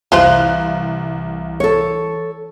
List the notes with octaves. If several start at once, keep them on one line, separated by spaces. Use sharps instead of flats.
C2 E3 F4 C5 F5 F#6
A4 C#5